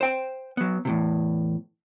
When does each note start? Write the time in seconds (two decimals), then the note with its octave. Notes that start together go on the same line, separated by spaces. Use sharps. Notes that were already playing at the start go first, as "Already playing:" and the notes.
0.01 C5 G5
0.57 F#3 B3
0.85 E2 A2 C3